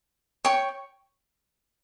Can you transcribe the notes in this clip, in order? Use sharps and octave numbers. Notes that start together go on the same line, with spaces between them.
C#5 G5 C#6